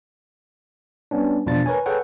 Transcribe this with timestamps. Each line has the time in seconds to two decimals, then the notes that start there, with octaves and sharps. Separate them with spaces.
1.11 G3 B3 C#4 D4
1.46 E2 B2 F3 D4 F4 A6
1.66 A#4 B4 C#5 G#5
1.86 G#4 A4 B4 C#5 F#5 G5